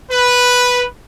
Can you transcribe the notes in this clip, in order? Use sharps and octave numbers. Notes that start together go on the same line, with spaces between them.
B4